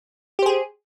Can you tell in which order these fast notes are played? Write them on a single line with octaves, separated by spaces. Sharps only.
G4 C5 G#4